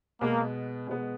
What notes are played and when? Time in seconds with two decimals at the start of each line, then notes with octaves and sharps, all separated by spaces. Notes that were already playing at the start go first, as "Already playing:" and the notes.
0.21 B2 G#3 A#3 B3
0.87 B2 G#3 B3